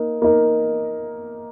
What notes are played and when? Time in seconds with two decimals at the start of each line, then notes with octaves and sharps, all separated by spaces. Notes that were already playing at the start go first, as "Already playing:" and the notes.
Already playing: A#3 D#4
0.22 A#3 D#4 A#4